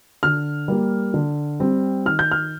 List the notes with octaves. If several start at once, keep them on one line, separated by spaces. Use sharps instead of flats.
D3 F6
G3 A#3
D3
G3 C4
D#3 F6
G6
F6